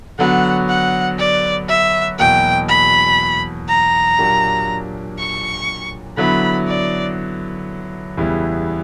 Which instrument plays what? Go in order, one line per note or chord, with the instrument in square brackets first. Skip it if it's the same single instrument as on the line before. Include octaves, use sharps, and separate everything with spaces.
[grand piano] D3 F#3 B3 F#4 [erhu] F#5
[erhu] F#5
D5
E5
[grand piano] E2 B2 F#3 A#3 [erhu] G5
[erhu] B5
A#5
[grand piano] A#2 F#3 A#3 D4 G4
[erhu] C#6
[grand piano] D3 F#3 B3 E4 [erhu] B5
[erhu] D5
[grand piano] E2 C#3 G3 B3 E4